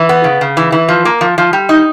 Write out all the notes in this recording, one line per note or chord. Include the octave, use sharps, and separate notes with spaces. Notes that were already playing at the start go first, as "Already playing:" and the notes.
Already playing: E3
B3
C#3
C#3
E3
E3
F3
A#3
F3
F3
G3
D#4